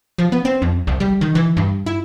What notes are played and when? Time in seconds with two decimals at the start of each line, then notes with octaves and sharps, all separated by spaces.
0.18 F3
0.32 B3
0.45 C4
0.62 F2
0.87 C2
1.00 G3
1.21 D#3
1.35 E3
1.57 G2
1.86 E4